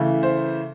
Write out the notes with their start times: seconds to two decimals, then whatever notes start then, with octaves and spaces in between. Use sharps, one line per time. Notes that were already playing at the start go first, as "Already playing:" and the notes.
Already playing: C#3 E3 A3
0.23 C5